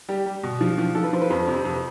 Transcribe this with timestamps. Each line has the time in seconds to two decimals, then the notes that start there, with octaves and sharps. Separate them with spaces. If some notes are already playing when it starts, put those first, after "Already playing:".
0.09 G3 G4
0.26 G3
0.43 B2
0.61 F3
0.78 F3
0.95 F3 A4
1.04 B4
1.13 F3 C5
1.21 B4
1.30 F2 C5
1.48 C3
1.65 F2